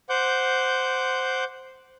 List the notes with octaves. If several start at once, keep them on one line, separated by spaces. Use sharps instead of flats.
C5 F#5 D6 G6